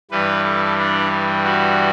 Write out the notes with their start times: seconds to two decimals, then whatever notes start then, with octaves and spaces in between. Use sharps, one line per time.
0.11 G2 E3 G3 B4
0.44 A4
0.78 D4
1.44 F#4